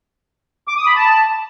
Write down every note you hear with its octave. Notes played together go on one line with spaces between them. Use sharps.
D6
D#6
B5
A5